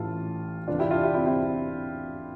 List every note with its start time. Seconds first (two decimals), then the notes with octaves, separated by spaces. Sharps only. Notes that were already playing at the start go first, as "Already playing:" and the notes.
Already playing: A1 A2 E3 F4 A4
0.68 F1 E2 D3 D4 F4
0.79 E4 G4
0.91 D4 F4
1.03 E4 G4
1.14 C4 E4
1.26 C4 E4